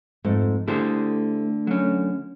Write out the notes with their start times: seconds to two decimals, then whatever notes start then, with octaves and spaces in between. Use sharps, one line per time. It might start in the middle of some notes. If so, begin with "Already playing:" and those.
0.24 F2 G#2 A3
0.68 D3 A3 E4 G4 G#4 C5
1.67 F#3 C#4